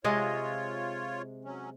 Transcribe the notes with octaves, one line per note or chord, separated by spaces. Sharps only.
C3 G#3 F4 C#5 D#5
F#3 C#4